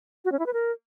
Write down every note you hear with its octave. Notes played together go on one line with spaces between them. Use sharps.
F#4
C#4
E4
B4
A#4